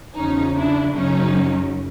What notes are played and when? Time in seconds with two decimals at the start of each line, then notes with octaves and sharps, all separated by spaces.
0.15 E2 C#3 F3 C#4 D#4
0.55 D4 E4
0.94 F#2 C#3 F#3 C#4 D#4